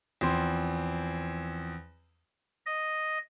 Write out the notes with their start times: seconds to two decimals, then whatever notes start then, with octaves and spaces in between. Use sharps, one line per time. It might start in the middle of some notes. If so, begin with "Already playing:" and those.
0.21 E2 F3 C4 C6
2.66 D#5